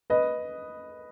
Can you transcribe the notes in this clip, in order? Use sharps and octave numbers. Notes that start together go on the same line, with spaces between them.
B4 D#5